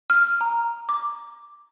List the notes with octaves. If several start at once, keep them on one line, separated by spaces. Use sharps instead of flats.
F6
A#5
D6